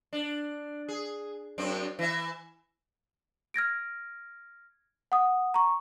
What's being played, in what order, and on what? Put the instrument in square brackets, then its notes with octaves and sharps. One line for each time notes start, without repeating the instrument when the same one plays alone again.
[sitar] D4
G#4
F#2 C4 D4
E3 E5
[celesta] F6 G#6 A#6 D7
F#5 D#6
A#5 C#6